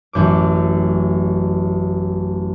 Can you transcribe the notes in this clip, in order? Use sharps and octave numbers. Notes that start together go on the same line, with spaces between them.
A1 F#2 D6